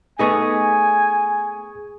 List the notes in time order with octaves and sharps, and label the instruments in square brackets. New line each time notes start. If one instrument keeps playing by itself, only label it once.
[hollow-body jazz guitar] A3 B3 D#4 [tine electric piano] G#4 C#6 D#6 [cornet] G#5